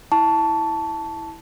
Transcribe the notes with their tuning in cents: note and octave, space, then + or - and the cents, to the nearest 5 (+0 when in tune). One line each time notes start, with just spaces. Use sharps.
E4 -10 A5 +0 C#6 +30